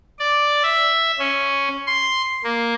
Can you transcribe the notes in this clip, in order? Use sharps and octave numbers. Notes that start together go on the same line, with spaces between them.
D5
E5
C#4
C6
A#3